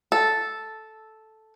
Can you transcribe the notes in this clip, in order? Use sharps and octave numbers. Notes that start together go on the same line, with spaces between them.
A4